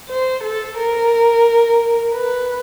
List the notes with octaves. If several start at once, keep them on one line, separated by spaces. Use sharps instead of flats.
C5
A4
A#4
B4